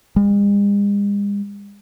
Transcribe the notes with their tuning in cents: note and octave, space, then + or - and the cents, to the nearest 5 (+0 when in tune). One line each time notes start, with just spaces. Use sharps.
G#3 -45